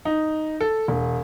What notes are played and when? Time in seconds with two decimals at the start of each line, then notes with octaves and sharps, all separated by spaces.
0.05 D#4
0.61 A4
0.88 E1